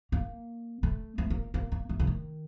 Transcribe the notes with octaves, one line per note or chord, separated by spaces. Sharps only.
A#3
A3
A3
A#3
A#3
A#3
A3
D3
D#3